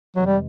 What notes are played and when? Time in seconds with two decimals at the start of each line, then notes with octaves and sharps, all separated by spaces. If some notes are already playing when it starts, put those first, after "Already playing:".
0.16 F2 C3 E3 F#3 G#3
0.26 G3